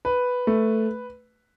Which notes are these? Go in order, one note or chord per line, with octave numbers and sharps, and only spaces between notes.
B4
A3